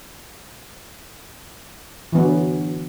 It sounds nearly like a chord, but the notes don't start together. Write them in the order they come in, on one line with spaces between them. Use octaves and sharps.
E3 B3 F#3 D3